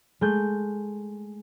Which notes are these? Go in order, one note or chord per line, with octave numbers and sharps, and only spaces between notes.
G#3 A3 A5 G6